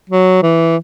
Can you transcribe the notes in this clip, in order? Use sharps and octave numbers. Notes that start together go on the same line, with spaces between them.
F#3
E3